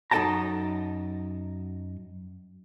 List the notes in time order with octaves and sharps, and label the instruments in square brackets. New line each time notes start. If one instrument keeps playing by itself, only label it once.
[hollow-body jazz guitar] F#2 D#4 A4 G5 A5 A#5